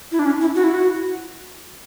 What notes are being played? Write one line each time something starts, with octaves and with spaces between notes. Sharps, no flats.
E4
D4
C#4
E4
F#4
E4
F#4